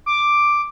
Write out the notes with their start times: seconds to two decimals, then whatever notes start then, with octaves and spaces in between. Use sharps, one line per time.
0.06 D6